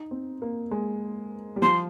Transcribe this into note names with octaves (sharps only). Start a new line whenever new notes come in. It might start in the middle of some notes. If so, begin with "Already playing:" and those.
Already playing: D#4
C4
A#3
G#3
G3
F3 C6